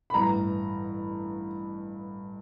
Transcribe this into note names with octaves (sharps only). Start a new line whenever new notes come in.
B5
A1 G2 E3 A#5